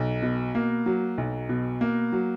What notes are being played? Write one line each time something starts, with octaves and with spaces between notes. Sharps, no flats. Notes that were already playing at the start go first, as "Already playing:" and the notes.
Already playing: B1
B2
A#3
F#3
B1
B2
A#3
F#3